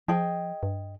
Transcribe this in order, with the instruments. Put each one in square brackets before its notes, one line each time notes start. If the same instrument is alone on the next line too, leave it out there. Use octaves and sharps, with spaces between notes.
[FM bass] F3 [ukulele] G#4 D#5 G5
[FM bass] G2